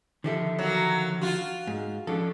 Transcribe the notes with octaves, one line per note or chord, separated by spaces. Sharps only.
D3 D#3 F3 G4 A4 E5
F#3 A#3
F4 F#4
G#2
F3 C#4 D4 A4